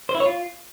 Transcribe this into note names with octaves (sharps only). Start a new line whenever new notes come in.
C5
E4
C#5
F4